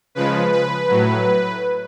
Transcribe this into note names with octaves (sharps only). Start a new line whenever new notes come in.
C#3 F3 G#3 B4
B4
A2 F#3